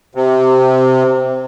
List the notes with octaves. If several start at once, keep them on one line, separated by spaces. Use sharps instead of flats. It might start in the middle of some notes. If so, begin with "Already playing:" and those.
C3